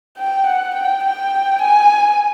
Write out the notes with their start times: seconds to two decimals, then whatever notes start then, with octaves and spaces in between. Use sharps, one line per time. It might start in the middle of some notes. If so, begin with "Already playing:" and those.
0.18 G5
0.46 F#5
0.75 G5
1.04 G5
1.62 G#5